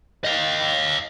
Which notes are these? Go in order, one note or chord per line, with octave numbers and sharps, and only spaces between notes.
D#5 F5